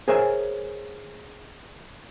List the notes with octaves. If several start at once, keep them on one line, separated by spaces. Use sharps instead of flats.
G#4 A#4 C5 C#5 E5 G#5